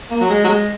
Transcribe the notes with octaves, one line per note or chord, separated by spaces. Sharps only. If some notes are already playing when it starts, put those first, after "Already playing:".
A#3
F#3
G#3
F#3
G#3